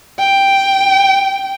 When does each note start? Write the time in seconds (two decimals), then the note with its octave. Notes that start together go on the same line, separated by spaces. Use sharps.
0.19 G5